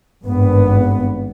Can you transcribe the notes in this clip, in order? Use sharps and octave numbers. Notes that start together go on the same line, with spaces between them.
G#1 G2 B3